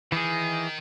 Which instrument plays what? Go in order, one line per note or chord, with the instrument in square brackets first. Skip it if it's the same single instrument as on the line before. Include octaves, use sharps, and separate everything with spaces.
[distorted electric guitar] D#3 [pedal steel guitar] E3 G#4